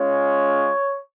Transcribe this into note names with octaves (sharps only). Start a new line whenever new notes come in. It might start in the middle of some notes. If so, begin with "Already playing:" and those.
Already playing: G#3 C#4 F4 C#5